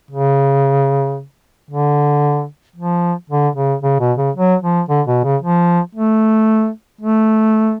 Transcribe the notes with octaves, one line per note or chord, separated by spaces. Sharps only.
C#3
D3
F3
D3
C#3
C#3
B2
C#3
F#3
F3
D3
B2
C#3
F3
A3
A3